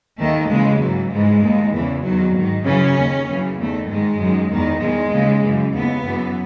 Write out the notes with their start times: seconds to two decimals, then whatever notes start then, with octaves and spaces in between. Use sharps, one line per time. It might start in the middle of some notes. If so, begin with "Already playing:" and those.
0.19 D#2 D#3 A3
0.50 D#2 C#3 E3 G#3
0.81 G#2 E3 F#3
1.11 G#2 E3 G#3
1.42 D#2 D#3
1.73 E2 C#3 E3
2.04 E2 D#3 F#3
2.34 G#2 D#3
2.65 F#2 C#3 E3 C#4
2.96 D#2 D#3
3.27 F#2 C#3 E3
3.58 E2 D#3 A3
3.88 G#2 D#3 G#3
4.19 F#2 D#3
4.50 E2 D#3
4.81 E2 D#3 G#3
5.12 D#2 C#3 E3
5.42 F#2 C#3 E3
5.73 D#2 C#3 E3 B3
6.04 F#2 E3